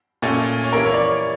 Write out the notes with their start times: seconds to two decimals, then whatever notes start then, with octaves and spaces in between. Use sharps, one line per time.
0.22 A#2 A3 C#4
0.64 C#5
0.73 E3 A#3 E4 A#4
0.85 C#5
0.94 D5
0.97 C#5